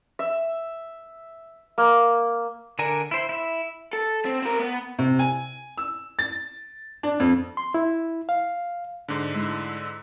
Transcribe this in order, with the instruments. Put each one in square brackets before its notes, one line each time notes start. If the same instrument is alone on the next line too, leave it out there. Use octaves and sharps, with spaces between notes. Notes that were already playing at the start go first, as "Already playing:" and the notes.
[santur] E5
A#3
[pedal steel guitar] D3 D4 A#4 G#5
E4 C5
E4 E5
[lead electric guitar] A4
C4
C4 A#4
B3
[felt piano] C3
G#5
E6
A6
D4
F2
[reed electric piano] C6
E4
F5
[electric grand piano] G#2 D3 [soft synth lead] D4
[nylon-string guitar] G#3 E4 A5 [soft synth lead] E6